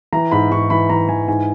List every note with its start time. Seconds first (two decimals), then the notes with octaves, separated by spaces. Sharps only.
0.13 E3 A#5
0.31 G#2 B5
0.52 G#2 C#6
0.70 E3 B5
0.89 E3 A#5
1.08 E3 G#5
1.28 G#2 G#5